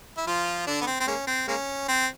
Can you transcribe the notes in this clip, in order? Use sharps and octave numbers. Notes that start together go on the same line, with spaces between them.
E4
F3 F4
D3 D4
B3
C4
C4
G#3 A#3 C#4
C4
G#3 A#3 C#4
C4